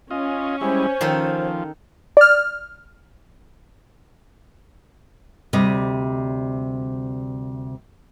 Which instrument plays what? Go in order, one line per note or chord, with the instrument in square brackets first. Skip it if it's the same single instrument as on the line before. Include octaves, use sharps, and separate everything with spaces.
[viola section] C#4 [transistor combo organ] F4 D#5
[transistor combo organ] G3 G#3 E4 [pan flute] C5
[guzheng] D#3 D#4 A4 [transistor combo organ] F3
[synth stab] D5 F6
[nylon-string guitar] D2 C3 G3 D#5